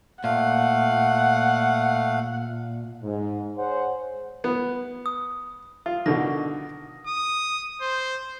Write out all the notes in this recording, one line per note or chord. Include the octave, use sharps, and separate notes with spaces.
A#2 A3 F5 F#5
G#2
G#4 C5 C#5 F#5
B3
D#6
F4
B2 D3 D#3 A#6
D#6
C5